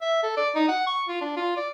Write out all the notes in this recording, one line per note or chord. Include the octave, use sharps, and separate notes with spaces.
E5
A4
D5
D#4
F#5
C#6
F4
D4
F4
D5